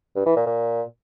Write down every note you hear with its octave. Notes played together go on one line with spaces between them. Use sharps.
G2
E3
A#2
A#2